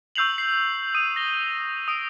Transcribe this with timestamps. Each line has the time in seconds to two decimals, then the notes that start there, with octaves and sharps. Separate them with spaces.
0.15 C#6 E6 G6 C7 F7 F#7
0.38 C7
0.95 D#6 D#7
1.16 A#6 G7
1.88 D#6 D7